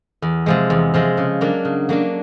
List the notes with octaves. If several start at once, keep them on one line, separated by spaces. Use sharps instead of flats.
E2
C3 F3 G#3
E2
C3 F3 G#3
C#3
F#3 A#3 D4
C#3
F#3 A#3 D4